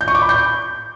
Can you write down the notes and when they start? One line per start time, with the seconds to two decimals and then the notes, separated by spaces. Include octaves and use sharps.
0.01 G6
0.08 C#6
0.15 D6
0.22 B5
0.29 G6